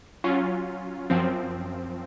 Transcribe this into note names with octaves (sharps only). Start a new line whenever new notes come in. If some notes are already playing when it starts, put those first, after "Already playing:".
F#3 C#4 F4
F#2 F3 C4